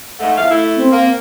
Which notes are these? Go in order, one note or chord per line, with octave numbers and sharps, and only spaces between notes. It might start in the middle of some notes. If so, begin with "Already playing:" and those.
G#2 A3 F#5
E2 F3 E5 F5
A3 E4
C4
A#3